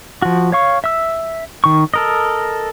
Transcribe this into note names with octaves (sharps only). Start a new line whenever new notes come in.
F3 F#4
C#5 F5 C#6
E5 E6
D#3 C#6
A4 A#4 D#5